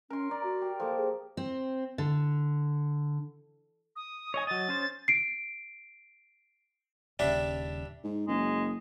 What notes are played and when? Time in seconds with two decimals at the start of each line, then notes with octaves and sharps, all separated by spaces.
0.10 C#4 A#4 C6
0.31 D5 A#5
0.44 F#4
0.62 G4
0.80 F3 A#3 A4
0.97 G#4
1.37 C4
1.98 D3
3.96 D#6
4.34 C#5 D#5 G#5
4.47 F#3 D#5 A6
4.69 C#4 C5
5.08 C7 D7
7.19 D#1 C#3 G3 D4 E5
8.04 G#2
8.28 F#1 G#3